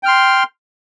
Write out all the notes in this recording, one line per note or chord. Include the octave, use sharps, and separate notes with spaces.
G5 C6 F6